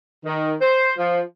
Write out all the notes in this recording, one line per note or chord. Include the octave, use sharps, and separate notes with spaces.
D#3
C5
F3